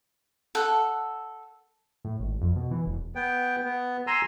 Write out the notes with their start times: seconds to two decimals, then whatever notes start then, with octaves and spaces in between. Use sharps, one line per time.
0.55 A4 F#5
2.05 A2
2.20 G#1
2.41 F2
2.56 B2
2.71 E3
2.86 E1
3.15 B3 G5
3.64 B3
4.07 G#5 A#5 C6 E6